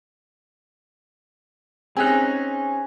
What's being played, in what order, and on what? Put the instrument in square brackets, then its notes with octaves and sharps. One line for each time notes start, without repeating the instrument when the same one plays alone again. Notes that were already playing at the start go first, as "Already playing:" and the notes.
[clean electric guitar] C4 C#4 D#4 [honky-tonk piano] G#4 F#6